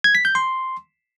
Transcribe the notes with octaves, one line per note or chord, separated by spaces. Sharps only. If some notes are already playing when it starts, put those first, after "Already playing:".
G#6
B6
G6
C6